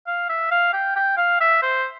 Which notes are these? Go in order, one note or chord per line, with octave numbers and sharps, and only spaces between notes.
F5
E5
F5
G5
G5
F5
E5
C5